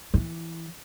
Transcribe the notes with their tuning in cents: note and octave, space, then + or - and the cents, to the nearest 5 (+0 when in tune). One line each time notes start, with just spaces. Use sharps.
E3 +0